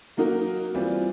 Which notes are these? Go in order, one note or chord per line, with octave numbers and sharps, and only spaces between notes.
F#3 A#3 D#4 F#4 A#4
E3 G3 C4 F4